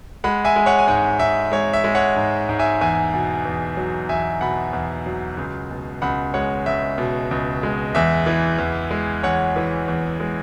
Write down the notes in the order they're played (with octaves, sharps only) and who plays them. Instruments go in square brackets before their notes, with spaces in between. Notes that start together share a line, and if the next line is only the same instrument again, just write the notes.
[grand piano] G#3 F#5 B5
E5 G#5
G#3
C#5 F#5
G#5
G#2 C#5 F#5
G#2 E5
G#3 C#5
E5
G#3
C#5 F#5
G#2
G#2
E5 G#5
E2 E5 G#5
B2
E2
F#3
E2 E5 G#5
B2 F#5 B5
E2
F#3
C#2
B2
C#2 F#5 B5
G#3 C#5 F#5
C#2 E5
B2
C#2
G#3
E2 E5
E3
E2
G#3
E2 C#5 F#5
E3
E2
G#3